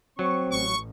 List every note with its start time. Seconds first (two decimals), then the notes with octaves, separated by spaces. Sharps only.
0.19 F#3 C4 C#6
0.51 A1 C#6